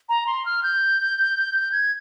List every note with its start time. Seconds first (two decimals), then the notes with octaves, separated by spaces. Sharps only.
0.09 A#5
0.27 C6
0.46 F6
0.63 G6
1.72 G#6